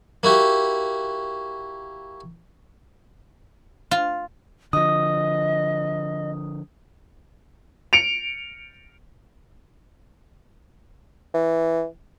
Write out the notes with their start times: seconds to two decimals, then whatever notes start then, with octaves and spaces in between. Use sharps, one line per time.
0.23 A#3 E4 F#4 G4
3.91 F4
4.73 D3 F3 D#5 D#6
7.93 C#7 D7 F7
11.34 E3